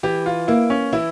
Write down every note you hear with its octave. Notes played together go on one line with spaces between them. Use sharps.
E3 G4
F4
A#3 E4
C#4
E3 E4